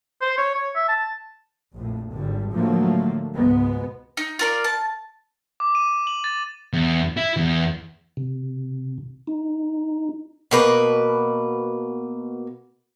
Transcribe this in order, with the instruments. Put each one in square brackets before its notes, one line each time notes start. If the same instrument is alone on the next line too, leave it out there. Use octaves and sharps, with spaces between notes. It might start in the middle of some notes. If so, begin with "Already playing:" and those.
[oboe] C5
C#5
C#5
E5
A5
[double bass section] A#1 F2 A2
G#1 G#2 D3 G3
A2 D3 F3 F#3 A3 A#3
C#2 G#2 B2 G#3 B3
[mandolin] D#4
F4 A#4 D5
A5
[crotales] D6
D#7
F#7
A6
[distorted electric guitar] E2
E4
E2
[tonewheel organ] C3
D#4
[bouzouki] B2 A#3 B4